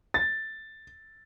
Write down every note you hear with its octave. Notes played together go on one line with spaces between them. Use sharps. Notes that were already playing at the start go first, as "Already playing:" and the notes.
A6